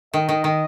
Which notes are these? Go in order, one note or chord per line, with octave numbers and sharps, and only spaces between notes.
D#3 D#5
D#3
D#3